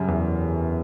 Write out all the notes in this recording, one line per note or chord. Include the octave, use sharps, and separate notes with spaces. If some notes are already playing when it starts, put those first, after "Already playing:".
Already playing: F#2 C#3 G3
E2